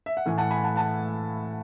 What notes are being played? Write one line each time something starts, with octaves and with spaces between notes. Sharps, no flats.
E5
F#5
A2 E3 A3 G#5
F#5 A5
G#5 B5
F#5 A5
F#5 A5